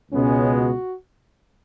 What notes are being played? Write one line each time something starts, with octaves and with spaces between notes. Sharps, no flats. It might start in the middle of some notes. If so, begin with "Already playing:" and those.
C#2 B2 G#3 B3 C#4
F#4